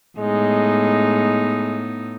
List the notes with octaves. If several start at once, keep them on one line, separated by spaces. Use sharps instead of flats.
A2 G#3 B3 D#4